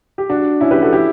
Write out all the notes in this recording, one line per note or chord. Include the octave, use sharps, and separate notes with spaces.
G4
D4 F#4
C#4 E4
G4 B4
F#4 A4
E4 G4